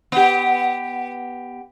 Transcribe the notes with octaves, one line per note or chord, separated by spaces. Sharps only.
B3 G4